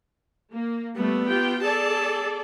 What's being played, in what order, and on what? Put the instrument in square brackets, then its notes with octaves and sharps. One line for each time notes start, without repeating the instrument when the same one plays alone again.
[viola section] A#3
[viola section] G3 A3 [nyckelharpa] B3
[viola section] F4 G4 G5
[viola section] G#4 A4 D5 [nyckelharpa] A5